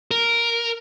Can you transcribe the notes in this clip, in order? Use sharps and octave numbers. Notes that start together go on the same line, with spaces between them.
A#4